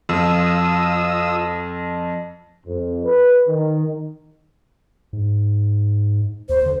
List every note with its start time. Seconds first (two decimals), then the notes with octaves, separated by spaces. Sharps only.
0.09 F2 F4 D#6 E6
2.66 F2
3.04 B4
3.47 D#3
5.13 G#2
6.49 D#2 C5
6.66 D3